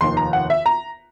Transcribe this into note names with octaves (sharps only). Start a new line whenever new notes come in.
F1 D#2 D#3 C6
A#5
F#5
E5
A#5